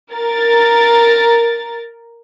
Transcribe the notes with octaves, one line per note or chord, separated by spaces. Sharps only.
A#4 A6